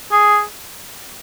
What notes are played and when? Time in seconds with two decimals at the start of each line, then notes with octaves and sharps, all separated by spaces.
0.11 G#4